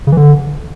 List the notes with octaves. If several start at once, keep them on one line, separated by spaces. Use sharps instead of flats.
C#3
E3
D3